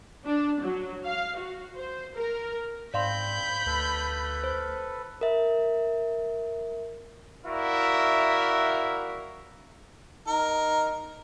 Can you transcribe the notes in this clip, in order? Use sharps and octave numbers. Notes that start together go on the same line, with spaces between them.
D4
F#3
F5
F#4
C5
A#4
G#2 C4 D5 F5 B5 C6 G6
D2 A4 B4
C5
A#4 E5
E4 F#4 A#4 D5 E5 F5
D#4 A#4